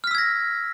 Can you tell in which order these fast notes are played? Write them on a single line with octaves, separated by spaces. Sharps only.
F6 B6 E6 G#6 A#6